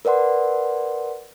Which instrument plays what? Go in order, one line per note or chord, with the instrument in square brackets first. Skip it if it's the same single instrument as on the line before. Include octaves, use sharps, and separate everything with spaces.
[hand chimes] A#4 B4 D5 F#5 C6